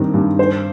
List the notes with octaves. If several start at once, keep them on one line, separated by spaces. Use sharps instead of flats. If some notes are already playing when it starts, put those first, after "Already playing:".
Already playing: G2 D#3 C4
G2
C5